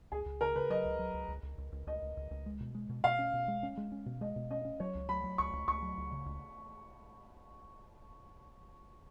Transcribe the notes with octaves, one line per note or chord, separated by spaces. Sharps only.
C#2 G#4
C#2
C#3 A#4
C#3 B4
F#3 D#5
C#2
F#3
C#2
C#2
C#2
C#2
C#2
C#2 D#5
C#2
C#2
C#2
G#3
B2
G#3
B2
B2 F5
C#4
B2
G#3
C#4
G#3
C#4
B2
G#3 D#5
B2
C#4 D#5
C#4
F#3 C#5
C#2
F#3 B5
F#3
C#2 C#6
C#2
C#2 C#6
F#3
C#2
C#3
C#2